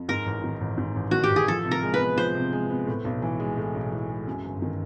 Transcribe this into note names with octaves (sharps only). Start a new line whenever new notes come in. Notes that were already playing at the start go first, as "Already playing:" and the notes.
Already playing: F2
G#2 A#4
A1
D#3
A1
G#2
A1
D#3 F#4
G4
A1
G#4
F3 A4
C3
A#4
G#3
B4
B3
F3 C5
C3
G#3
B3
A2
B1
E3
G#3
A2
B1
E3
G#3
F#2
G1
D#3